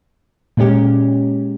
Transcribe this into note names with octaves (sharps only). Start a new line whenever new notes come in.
A#2 G#3 C#4 G4